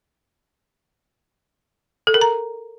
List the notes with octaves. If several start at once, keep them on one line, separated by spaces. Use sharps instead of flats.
A4
A#4
A#5